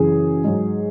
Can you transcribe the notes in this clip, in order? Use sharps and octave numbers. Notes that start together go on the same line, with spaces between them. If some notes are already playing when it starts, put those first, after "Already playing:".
Already playing: F#2 C#3 E3 G#4
G#2 F#3